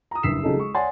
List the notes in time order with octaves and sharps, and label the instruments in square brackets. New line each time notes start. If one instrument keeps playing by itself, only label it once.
[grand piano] A#5 D#6
F#1 G2 E6 B6 C7 E7
C#3 F3 F#3 D#4 G#4 A4
G#3 C#6
C#5 D5 F#5 G#5 C6 A6